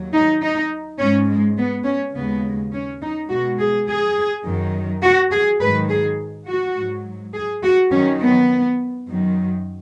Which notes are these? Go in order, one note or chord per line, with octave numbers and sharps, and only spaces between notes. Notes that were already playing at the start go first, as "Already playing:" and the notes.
Already playing: D#2 F#3
D#4
D#4
G#2 G#3 C#4
G#3
B3
C#4
D#2 C#3 G#3 B3
C#4
D#4
B2 G#3 F#4
G#4
G#4
F#2 D#3 F#3
F#4
G#4
G#2 D#3 F#3 B4
G#4
F#4
G#2 F#3
G#4
F#4
F#2 D#3 F#3 C#4
B3
F#2 D#3 F#3